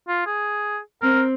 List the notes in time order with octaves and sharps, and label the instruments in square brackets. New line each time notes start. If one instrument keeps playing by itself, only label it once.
[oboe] F4
G#4
[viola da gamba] C4 [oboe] A#4